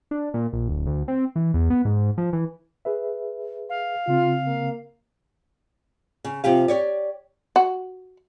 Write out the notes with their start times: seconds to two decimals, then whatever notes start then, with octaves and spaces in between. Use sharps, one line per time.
0.11 D4
0.34 A#2
0.53 A#1
0.69 D1
0.87 D2
1.08 C4
1.36 E3
1.54 E2
1.70 B3
1.85 G#2
2.18 F3
2.33 E3
2.85 G#4 B4 E5
3.69 F5
4.08 C#3 C4 F4
4.47 A#3
6.25 C#3
6.44 C3 F3 G4 F5
6.68 G4 C#5 D5
7.56 F#4